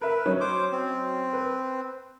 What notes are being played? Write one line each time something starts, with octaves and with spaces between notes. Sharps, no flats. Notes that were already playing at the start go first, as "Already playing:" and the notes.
A#4 B4 E5
F#3 C#4 D#4
C5 D6
C4
B4